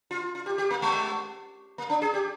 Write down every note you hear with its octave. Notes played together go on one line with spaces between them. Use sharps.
F4
F4
G4
G4
A#3
G#3
A#3
D4
G#4
G4